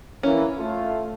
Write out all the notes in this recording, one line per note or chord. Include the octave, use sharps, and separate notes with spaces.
E3 A#3 C#4
A3 F4